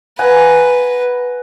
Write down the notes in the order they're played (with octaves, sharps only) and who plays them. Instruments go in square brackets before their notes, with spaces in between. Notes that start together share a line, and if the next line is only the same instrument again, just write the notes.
[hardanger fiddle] B4 [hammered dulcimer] F#5 G#5 A#5